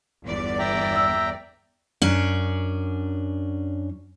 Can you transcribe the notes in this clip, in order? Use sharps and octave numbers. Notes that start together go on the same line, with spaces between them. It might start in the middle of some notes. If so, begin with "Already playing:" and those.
G1 E2 D5
E5 G5 A#5
E6
F#2 C#4 D4